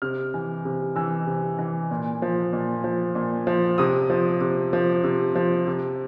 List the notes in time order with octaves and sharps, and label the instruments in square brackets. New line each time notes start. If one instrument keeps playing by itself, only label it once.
[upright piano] C3 F6
E3
C3
E3 E6
C3
E3
A#2
F3
A#2
F3
A#2
F3
C3 D#6
F3
C3
F3
C3
F3
C3